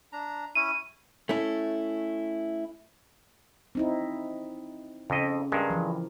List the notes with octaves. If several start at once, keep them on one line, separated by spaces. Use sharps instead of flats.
D4 A#5
C#4 E4 D#7
A3 C#4 E4
C4 D#4 E4
F2 C#3 D#5
G2 G#3 A#4
E3 F3